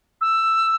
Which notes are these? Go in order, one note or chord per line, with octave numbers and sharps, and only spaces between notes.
E6